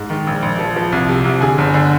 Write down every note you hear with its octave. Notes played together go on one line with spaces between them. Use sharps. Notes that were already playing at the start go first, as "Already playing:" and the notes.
Already playing: G#2
D#3
A#1
A#1
F3
F3
C2
C3
C2
D3 G#4 G#5
G1
D3